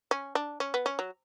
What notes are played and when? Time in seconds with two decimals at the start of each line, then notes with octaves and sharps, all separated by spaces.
0.11 C#4
0.35 D4
0.60 C#4
0.74 B3
0.86 C#4
0.99 F#3